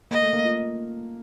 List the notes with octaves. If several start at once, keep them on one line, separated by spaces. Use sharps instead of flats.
A#3 D#5
A3
A#3
F4